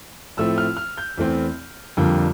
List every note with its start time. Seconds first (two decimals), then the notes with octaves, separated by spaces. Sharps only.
0.37 A2 F3 A3 C4 E6
0.58 F6
0.77 F6
0.98 G6
1.18 E2 E3 A3 C4
1.97 F2 D3 G3 A#3